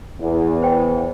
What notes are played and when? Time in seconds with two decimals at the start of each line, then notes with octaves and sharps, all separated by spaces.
0.20 E2
0.62 C5 G5